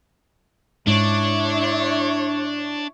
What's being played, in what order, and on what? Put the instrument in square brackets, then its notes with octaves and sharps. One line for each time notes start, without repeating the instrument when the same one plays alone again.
[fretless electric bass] G#2 [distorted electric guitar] D4 D5 [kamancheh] E4 C#5